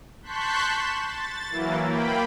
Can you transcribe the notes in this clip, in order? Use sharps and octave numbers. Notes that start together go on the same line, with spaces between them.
A5 C6 C#6 F#6 G6 B6
E7
A6
E3 F#3 A#3 E4
A#3 G5 B5